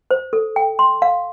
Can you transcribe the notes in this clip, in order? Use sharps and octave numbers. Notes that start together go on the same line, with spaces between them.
C5
A4
G5
C6
F5